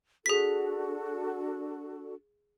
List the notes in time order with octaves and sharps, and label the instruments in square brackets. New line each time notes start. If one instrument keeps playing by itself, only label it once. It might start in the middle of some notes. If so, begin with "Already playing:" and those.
[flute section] D4 F#4 A4 [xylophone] G#4 B6